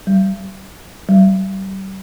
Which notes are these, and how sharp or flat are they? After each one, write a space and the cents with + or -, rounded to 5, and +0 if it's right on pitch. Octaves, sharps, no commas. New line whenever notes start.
G3 -30
G3 -35